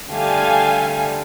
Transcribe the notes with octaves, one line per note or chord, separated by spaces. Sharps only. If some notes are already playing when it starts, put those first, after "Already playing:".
D3 G3 A3 F5 G#5